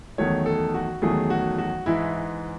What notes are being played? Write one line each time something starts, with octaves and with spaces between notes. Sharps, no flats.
E2 D#3 F#3 A3 C#5
A4
F#4
E2 D#3 F#3 A3 G#4
F#4
F#4
G#2 E3 G#3 E4